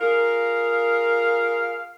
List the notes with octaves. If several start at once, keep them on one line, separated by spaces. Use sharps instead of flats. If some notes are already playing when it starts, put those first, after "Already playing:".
F4 G#4 A#4 F5